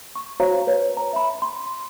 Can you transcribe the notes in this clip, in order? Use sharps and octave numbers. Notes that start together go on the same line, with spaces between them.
C#6
F#4 C5 C#5 F5 A#5
B4 C#5
A#5
E5 B5
C6